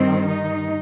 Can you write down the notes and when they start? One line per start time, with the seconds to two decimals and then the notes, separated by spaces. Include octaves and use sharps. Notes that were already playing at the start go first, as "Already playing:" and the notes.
Already playing: G2 D#3 C4
0.30 D#4